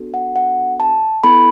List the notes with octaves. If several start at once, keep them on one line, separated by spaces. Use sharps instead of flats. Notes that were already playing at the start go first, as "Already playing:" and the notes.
Already playing: B3 D4 F#4 A4
F#5
F#5
A5
B3 E4 A4 B5